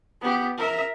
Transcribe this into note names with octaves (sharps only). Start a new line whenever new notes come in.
B3 G4
A#4 E5